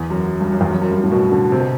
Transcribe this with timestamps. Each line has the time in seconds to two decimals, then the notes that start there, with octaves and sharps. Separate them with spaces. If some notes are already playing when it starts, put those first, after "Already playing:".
Already playing: E2
0.10 F#2
0.41 G2
0.51 F#2
0.61 E2
0.71 F#2
0.82 F#2
0.91 G2
1.03 A2
1.12 B2
1.32 D3
1.52 C3
1.60 B2